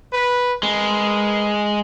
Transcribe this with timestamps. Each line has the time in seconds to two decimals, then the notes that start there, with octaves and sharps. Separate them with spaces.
0.12 B4
0.63 G#3 A#4 B4